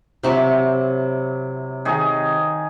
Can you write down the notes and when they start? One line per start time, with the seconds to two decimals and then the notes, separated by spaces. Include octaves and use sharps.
0.23 C3 F#3 E4 G4 E5 C#6
1.85 D#3 G#4 C#6